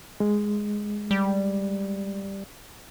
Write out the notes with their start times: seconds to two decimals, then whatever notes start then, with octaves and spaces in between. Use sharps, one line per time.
0.20 G#3
1.11 G3